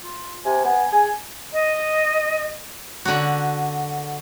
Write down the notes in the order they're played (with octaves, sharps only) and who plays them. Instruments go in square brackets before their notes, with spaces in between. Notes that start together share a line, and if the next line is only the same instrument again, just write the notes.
[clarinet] F4
[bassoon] C3 [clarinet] G#5
[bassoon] B3 [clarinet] G#5
[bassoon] G#4 [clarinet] G#5
[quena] D#5
[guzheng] D3 F#4